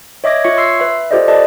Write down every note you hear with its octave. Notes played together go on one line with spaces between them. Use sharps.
C#5 D#5 E5 D6 G#6 A#6
F4 C#5 E5 C#6 G#6 C#7
C6 E6 C7
B4 E5
F4 G4 A4 C5 D5 D#5
A4 B4 D5 D#5 A5